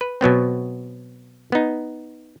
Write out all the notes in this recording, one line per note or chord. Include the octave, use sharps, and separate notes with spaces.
B4
B2 F#3 B3 C4
B3 D#4